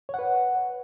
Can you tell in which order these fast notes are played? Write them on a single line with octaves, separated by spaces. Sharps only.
C#5 F#5 B4